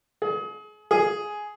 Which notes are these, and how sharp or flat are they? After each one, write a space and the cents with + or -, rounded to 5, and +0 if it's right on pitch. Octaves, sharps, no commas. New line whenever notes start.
G#4 +30
G#4 +5